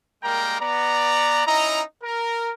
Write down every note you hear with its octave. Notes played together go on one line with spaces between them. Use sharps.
G3 G#3 A#3 A#4 G5 A#5
B3 D5 A#5
C#4 D#4 E4 D#5 A#5
A#4